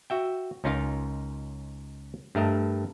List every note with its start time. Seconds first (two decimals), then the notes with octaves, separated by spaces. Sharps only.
0.10 F#4 E5 G5
0.64 C#2 C#4 D#4 F4 A#4 F5
2.35 G2 A3 A#4 D#5